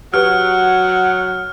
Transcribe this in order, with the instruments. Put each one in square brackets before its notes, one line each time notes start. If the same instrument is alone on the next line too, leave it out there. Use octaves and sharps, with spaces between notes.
[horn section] F#3 [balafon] G4 B4 [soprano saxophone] F#5 [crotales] F6